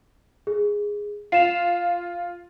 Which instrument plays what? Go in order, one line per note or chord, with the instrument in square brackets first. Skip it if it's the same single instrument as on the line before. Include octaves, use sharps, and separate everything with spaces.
[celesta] G#4
[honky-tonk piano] F4 [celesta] C7 E7 F7